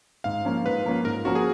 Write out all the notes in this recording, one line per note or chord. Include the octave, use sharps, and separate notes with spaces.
G#2 F5
F3 A#3 C#4 F4
G#2 B4
F3 A#3 C#4 F4
G#2 A#4
F3 A#3 C#4 F4 F#4
G#4